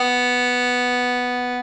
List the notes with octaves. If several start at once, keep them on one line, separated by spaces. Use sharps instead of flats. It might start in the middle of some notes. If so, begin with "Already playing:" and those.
Already playing: B3